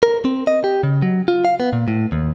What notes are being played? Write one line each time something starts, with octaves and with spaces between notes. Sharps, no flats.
A#4
C4
D#5
G4
C#3
F#3
F4
F5
B3
A#2
A2
D#2